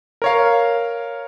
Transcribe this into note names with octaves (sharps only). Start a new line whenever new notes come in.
A#4 C#5 F5